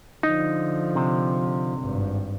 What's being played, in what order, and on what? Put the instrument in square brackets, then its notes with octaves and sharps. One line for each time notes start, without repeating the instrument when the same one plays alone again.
[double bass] D3 F3 [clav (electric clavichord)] D#4
[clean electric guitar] C3
[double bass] G#1 G2